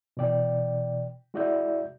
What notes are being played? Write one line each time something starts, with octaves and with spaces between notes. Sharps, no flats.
B2 E3 D5 G5
G#3 E4 F#4 D5 E5 G6